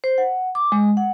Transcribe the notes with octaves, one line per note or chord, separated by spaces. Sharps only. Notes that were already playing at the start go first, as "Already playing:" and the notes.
C5
F#5
D6
G#3
F#5